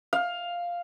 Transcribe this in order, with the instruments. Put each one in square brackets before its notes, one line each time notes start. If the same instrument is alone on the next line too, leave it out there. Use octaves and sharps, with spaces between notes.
[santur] F5